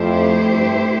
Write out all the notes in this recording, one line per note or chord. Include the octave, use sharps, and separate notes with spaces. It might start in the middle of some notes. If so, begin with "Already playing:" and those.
Already playing: F2 A3 E4 G4 C5
G2